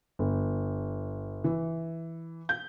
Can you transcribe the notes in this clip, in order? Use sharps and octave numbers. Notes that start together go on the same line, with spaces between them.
G1
E3
G6